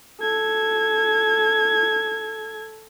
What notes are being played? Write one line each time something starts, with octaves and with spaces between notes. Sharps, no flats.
A4 G#6